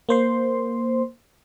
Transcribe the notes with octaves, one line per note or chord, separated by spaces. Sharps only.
A#3 C5 C6